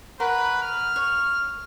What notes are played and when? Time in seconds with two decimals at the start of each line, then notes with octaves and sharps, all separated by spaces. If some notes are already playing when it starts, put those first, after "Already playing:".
0.20 A#4 B4 C#5 F#5
0.62 F6
0.96 C#5